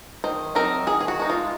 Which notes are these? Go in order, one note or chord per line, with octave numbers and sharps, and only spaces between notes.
D#3 C5
F#3 C4 D#4 A#4
D#3 G#4
G#4
F#4
G#3 D#4
F4